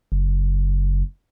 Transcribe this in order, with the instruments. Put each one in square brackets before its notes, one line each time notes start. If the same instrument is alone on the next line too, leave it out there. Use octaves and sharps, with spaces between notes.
[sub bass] F#1